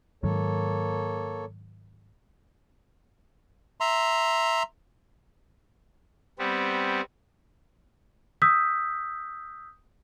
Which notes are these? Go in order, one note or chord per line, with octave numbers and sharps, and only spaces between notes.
G#2 D#3 F#3 A#3 A4 C#5
E5 A#5 C6
G3 B3 C4
D#6 E6 G6 B6